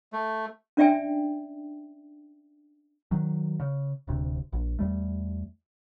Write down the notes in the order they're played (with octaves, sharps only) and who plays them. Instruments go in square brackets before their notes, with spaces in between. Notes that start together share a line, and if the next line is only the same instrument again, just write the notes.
[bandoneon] A3
[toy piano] C#4 D4 D5 E5 G5 G#5
[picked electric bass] D#3 F#3
C#3
D1 D2 C3
A#1
E2 G3 A3